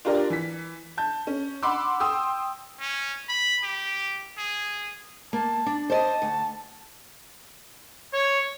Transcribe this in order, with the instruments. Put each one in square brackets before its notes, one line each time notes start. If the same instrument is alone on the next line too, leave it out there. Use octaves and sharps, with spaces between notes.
[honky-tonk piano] D4 F4 G4 A#4 D5
E3 B6
A5 G6
C#4
F#5 B5 C6 D6 E6
G5 C6 D#6 E6
[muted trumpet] C#4
B5
G4
G#4
[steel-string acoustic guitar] A#3 [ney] A5
[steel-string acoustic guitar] D4
[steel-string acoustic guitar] C5 D5 D#5 [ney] A5
[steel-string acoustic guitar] D2
[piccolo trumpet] C#5